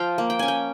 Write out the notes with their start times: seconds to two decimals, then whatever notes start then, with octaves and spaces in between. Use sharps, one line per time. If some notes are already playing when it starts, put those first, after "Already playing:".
Already playing: F3 F5 G5
0.18 A#3
0.30 G5
0.39 C#4 G#5
0.48 G5